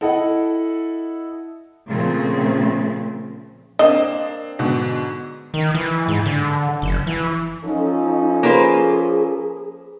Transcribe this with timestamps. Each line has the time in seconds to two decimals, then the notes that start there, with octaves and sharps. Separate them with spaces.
0.01 E4 A4 D#5 F#5
1.89 A#2 C#3 F3 A3 C4
3.79 A#3 C4 D4 D#5
4.59 G#2 B2 D3
5.54 D#3
5.75 E3
6.08 G#2
6.26 D3
6.82 F#1
7.07 E3
7.64 F3 C#4 D#4 A4
8.43 A#3 G#4 B4 C5